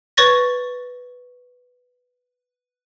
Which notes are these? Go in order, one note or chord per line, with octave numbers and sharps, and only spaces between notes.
B4 C#5 C#6 A6 A#6